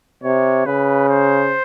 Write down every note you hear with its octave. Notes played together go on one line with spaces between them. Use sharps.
C3 C#5
C#3 B4
C5